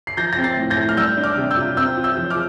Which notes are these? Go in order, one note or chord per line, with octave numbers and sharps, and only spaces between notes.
C7
F3 G6 A#6
C4 A#6
A6 C7
A2
G6 A#6
A2
F6
G3 E6 G6
D4
D6 F6
C3
E6 G6
F4
C4 E6 G6
F4
E6 G6
F3
D6 F6